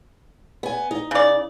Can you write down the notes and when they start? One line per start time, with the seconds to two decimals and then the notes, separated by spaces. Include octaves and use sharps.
0.63 B3 G#5
0.91 D#4
1.11 C#3 D5